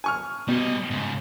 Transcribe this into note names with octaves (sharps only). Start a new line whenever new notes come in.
G#5 C#6 F6
B2 G3 D#5
G#2 C#3